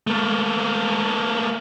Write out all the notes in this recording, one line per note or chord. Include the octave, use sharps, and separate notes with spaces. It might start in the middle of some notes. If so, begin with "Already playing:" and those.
A3 A#3